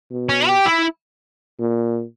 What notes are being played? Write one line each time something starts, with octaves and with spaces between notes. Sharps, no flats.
B2
C#4
G4
E4
A#2